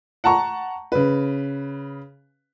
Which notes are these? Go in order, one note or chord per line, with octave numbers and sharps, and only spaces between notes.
F#5 A5 A#5 C#6
C#3 B4